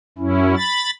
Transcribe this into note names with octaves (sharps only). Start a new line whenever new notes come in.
F#2 C#4 E4
B5 A6